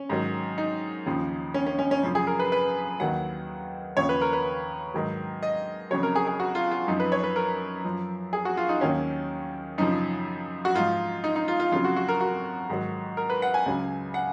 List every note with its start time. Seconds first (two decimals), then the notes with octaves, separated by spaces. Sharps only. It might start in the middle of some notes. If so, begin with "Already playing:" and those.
Already playing: C#4
0.10 G#2 D#3 F#3
0.58 D#4
1.06 D#2 C#3 F3
1.54 C#4
1.66 C#4
1.79 C#4
1.91 C#4
2.03 F#2 C#3 F3
2.15 G#4
2.27 A#4
2.39 B4
2.52 B4
3.00 D#2 D#3 F#3 F#5
3.97 D#2 C#3 F3 C#5
4.09 B4
4.22 A#4
4.33 B4
4.94 G#2 D#3 F#3
5.43 D#5
5.91 F2 C#3 F#3 C#5
6.03 A#4
6.15 G#4
6.27 G#4
6.40 F#4
6.55 F4
6.71 F4
6.88 F#2 F3 D#4
7.00 B4
7.12 C#5
7.24 B4
7.36 A#4
7.85 F#2 F3
8.33 G#4
8.45 F#4
8.57 F4
8.69 D#4
8.81 D#2 D#3 F#3 C#4
9.78 F#2 C#3 F3 D#4
10.65 F#4
10.75 G#2 F3 F4
11.24 D#4
11.36 D#4
11.48 F4
11.60 F4
11.72 F2 C#3 F#3 F4
11.84 F#4
11.96 F#4
12.09 A#4
12.21 F#4
12.70 G#2 D#3 F#3
13.17 A#4
13.30 B4
13.42 F#5
13.54 G#5
13.66 C#2 C#3 F#3
14.14 F#5